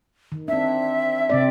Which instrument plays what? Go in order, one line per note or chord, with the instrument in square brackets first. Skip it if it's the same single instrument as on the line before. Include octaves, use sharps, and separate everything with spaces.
[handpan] D#3
[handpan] C4 D4 [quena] E5
[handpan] C3 C4 D5